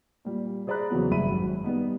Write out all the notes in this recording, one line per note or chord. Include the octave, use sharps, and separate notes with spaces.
A#2 G3
G#4 C5 D5 A#5 B5 F#6
E2 C#3 F#3 B3
F#1 G2 E5 B5 D#7
G#1 F#2
G3 B3 D#4